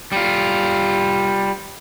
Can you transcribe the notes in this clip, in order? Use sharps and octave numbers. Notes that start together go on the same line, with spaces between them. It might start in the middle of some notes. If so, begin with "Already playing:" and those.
G3 F4